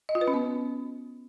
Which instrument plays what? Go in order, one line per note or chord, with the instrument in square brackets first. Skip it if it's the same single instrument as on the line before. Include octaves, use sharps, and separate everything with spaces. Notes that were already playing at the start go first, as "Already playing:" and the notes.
[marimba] D#5
F4
B4
C#4
B3